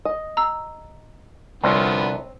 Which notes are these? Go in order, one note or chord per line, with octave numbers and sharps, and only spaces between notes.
D#5
A#5 E6
C2 D3 F3 B3 C4 C#5